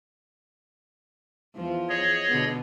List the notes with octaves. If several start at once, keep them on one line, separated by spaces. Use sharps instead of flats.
E2 F3
G#4 C#5 D#5
B2 D3 B3